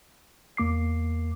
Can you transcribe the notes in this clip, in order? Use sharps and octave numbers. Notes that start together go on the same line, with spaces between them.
E2 A#3 D6 C7